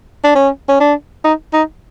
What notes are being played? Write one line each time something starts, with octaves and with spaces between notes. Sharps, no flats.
D4
C#4
C#4
D4
D#4
D#4